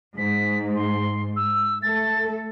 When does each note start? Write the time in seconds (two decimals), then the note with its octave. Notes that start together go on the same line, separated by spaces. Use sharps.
0.18 G#2 B6
0.76 C6
1.36 E6
1.82 A3 A4 A6